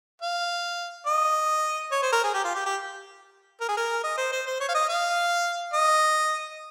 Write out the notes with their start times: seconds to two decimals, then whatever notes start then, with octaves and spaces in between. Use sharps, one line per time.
0.22 F5
1.06 D#5
1.91 C#5
2.02 C5
2.12 A#4
2.24 G#4
2.34 G4
2.44 F4
2.55 G4
2.66 G4
3.61 A#4
3.68 G#4
3.77 A#4
4.04 D#5
4.18 C5
4.32 C5
4.47 C5
4.60 C#5
4.69 F5
4.75 D#5
4.89 F5
5.73 D#5